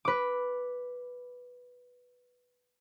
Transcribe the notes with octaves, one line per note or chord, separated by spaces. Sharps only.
B4 D6